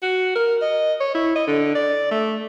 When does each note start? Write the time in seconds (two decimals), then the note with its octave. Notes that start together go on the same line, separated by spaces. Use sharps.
0.03 F#4
0.35 A#4
0.61 D#5
1.00 C#5
1.15 E4
1.35 D#5
1.47 D3
1.75 D5
2.11 A3